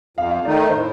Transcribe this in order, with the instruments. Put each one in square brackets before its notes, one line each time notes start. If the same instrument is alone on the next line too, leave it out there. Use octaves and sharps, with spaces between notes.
[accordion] F2 [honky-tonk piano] F5
[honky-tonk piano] F5
[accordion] D#3 A3 D#4 [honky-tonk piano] D5
[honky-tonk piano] A#4
[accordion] A2 [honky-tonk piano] C5